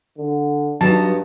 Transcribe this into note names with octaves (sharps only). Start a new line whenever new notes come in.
D3
G2 F#3 B3 D#4 A5